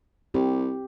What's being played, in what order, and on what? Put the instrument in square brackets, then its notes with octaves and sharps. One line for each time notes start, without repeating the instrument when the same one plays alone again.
[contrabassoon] C2 [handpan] C4 G4